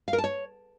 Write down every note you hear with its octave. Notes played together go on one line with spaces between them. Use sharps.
F5
A#4
A5
C#5